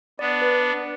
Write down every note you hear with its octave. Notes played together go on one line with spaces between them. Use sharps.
B3 D4 D5
B4
D5